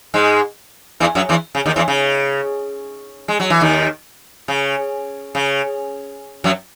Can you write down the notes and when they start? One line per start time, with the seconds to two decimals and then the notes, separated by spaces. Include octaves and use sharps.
0.14 G#2 G#3
1.00 E2 E3
1.15 F#2 F#3
1.29 E2 E3
1.55 C#3
1.66 D#2 D#3
1.76 E2 E3
1.88 C#3
3.28 G#3
3.40 F#3
3.50 E3
3.61 D#2 D#3
4.48 C#3
5.35 C#3
6.44 F#2 F#3